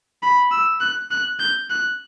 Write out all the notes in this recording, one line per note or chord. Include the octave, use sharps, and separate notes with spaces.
B5
E6
F#6
F#6
G6
F#6